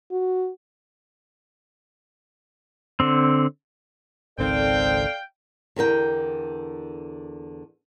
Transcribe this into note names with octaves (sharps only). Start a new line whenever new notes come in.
F#4
D3 C4
G#1 C#2 D#3 C4 A4 D5 F5 G5
E2 D3 A#4 G5